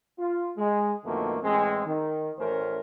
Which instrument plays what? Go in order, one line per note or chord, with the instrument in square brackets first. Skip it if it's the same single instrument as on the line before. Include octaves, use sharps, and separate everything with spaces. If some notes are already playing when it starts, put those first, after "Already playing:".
[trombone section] F4
G#3
F2 B2 D3 D#3 A3 A#3
A1 G#3 C4
D#3
A1 A3 C#4 A#4 C5